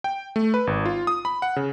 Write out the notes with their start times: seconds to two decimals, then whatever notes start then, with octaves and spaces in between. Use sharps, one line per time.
0.04 G5
0.36 A3
0.54 B4
0.67 G#1
0.85 F4
1.07 D#6
1.25 B5
1.42 F#5
1.56 C#3